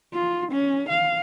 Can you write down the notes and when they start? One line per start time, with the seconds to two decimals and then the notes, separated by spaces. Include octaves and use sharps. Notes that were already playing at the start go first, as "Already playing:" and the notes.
0.13 F4
0.51 C#4
0.89 F5